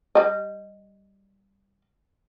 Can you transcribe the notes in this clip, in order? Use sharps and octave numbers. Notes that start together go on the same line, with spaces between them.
G3 D#5